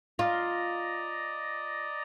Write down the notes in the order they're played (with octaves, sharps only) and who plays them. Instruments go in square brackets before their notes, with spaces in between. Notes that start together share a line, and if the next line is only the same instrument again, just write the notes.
[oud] F4 [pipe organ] D5 D#5 A#5